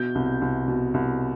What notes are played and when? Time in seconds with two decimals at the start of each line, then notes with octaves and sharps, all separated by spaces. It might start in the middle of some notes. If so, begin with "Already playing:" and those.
Already playing: B2 G6
0.15 C2
0.41 C2
0.68 B2
0.94 C2